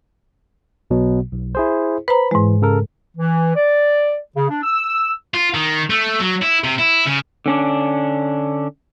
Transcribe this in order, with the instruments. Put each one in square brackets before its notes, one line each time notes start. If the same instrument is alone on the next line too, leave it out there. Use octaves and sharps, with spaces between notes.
[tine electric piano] B1 B2 F#3
B1
E4 G#4 C5
[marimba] B4 C5 A#5 [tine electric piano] B5
[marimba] G#2 G#3 [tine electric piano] E3
[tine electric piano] C#3 A4 A#4
[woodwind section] E3
D5
C#3
D4
E6
[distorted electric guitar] F4
D#3
A3
F#3
E4
C3
E4
C#3
[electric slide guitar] D3 C#4 D4